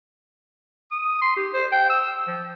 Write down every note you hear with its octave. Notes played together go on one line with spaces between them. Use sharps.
D#6
C6
G4
C5
G5
E6
F3